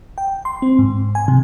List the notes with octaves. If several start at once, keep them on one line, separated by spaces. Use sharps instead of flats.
G5
C6
C4
G#2
G#5
C3